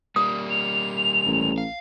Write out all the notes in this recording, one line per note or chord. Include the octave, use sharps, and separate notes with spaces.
G3 A#3 D#6
F7
A1
F5